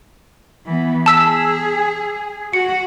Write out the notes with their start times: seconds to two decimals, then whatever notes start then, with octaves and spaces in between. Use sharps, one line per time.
0.66 E3 B3
1.06 G#4 A5 E6 B6
2.53 F#4 C#7